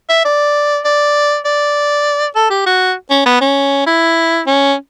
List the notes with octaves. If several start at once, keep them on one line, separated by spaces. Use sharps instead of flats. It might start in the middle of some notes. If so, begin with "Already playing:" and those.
E5
D5
D5
D5
A4
G4
F#4
C#4
B3
C#4
E4
C#4